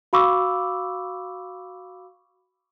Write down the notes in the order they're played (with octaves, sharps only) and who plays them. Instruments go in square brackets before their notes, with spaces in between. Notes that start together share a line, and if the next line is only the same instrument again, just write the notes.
[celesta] F#4 F5 B5 C#6 D6 E6